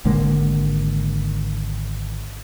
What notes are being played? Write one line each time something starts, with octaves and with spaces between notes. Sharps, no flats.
G#1 D3 G#3 A#3